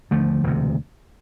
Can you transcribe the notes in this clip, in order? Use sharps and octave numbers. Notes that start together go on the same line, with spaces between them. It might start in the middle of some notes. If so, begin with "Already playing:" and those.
D#2 D3 F3 A3
E1 D2 C3